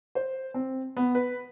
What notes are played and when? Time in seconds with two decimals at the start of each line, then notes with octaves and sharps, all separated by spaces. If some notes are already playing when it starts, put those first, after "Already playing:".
0.15 C5
0.54 C4
0.97 B3
1.15 B4